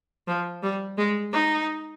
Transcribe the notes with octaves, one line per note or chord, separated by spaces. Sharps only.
F3
G3
G#3
D#4